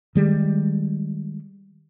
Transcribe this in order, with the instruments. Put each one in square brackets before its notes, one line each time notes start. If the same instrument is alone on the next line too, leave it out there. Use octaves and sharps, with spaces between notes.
[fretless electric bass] D#3 G3 G#3